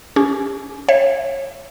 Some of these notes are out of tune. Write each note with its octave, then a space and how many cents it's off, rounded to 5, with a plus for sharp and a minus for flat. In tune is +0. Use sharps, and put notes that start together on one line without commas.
C#4 +25 G4 +40
C#5 -25 E5 +30